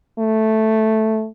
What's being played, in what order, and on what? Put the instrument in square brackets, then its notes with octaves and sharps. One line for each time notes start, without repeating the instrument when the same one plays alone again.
[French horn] A3